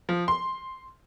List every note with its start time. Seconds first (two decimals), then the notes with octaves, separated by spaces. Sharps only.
0.09 F3
0.28 C6